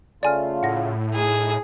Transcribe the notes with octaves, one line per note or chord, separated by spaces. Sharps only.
C#3 A3 F4 D5 G#5 F6
A2 F#5 A#6
D#4 G#4